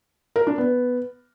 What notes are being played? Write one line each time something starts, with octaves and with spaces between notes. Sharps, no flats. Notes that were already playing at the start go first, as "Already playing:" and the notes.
A#4
D4
B3